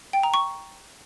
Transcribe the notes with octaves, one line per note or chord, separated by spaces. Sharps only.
G5
A#5
C#6